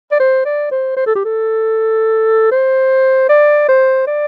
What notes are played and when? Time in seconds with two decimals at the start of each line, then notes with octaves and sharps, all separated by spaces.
0.12 D5
0.20 C5
0.45 D5
0.71 C5
0.97 C5
1.06 A4
1.16 G4
1.25 A4
2.52 C5
3.29 D5
3.69 C5
4.07 D5